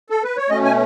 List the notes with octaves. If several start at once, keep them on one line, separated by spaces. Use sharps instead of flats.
A4
B4
C#5
B2 A3 C#4 D#5
G#5